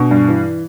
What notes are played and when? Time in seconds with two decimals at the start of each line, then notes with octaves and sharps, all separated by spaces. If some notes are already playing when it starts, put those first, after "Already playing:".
Already playing: B2 D4
0.11 G2
0.28 E3